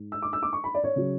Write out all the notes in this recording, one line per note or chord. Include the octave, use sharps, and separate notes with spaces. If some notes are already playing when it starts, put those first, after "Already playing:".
Already playing: G#2
E6
D6
E6
D6
C#6
B5
D5
C#5
C#3 F#3